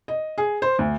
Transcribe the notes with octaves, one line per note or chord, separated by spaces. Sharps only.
D#5
G#4
C5
D2